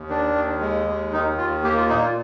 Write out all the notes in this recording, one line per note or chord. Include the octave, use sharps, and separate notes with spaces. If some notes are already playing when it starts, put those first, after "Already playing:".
Already playing: D#2
D#3 D4
D#2
G#3
D#2
D#3 D#4
D#2 F4
A#3 G4
F4
A#2 D#4
F4